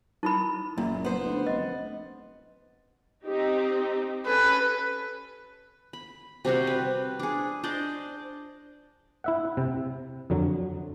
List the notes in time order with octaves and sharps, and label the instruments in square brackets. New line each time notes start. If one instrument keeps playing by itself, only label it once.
[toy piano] D#4 E4 B5
[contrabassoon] F#1 [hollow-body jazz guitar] F#2 A#2
[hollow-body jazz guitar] B3 C5
[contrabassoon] D2
[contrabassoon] F1 [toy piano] D#5
[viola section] C4 D#4 G4
[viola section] C#4 A4 [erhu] B4
[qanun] B5
C3 G3 C4 F#4
B4
D4 G#4
D4 C5 D5 D#5
[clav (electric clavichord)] E4 E5 F#5
C3
F2 D3 F#3